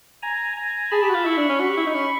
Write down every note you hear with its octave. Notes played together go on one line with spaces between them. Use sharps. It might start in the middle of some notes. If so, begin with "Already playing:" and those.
G#5 A#5
G#5 A#5
G#4 A5 B5
G4
F#4
F4
E4 B5 C#6
D4
C#4
F#4
G4
E4
D#4
C#4